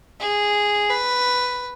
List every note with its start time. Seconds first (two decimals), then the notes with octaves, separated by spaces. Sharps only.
0.20 G#4
0.90 B4